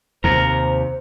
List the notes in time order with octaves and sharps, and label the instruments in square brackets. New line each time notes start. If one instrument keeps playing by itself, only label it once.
[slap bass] D#2 C3 [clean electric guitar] A#4 [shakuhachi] C5